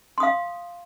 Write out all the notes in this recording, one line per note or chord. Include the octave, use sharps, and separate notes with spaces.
F5 C6 D#6